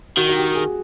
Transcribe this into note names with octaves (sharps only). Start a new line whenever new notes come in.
D#3 F#4
F#4
G4
G4
G#4